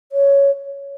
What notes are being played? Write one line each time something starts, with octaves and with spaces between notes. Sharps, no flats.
C#5